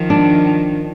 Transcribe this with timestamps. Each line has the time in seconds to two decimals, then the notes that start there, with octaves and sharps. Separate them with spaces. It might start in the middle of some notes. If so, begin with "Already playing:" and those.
Already playing: D#3 F3
0.10 D4